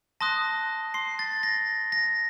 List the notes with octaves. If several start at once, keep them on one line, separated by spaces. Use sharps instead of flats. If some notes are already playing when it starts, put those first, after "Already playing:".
A5 C6 D#6 F#6 A#6
C6 C7
A6
A#6
A#6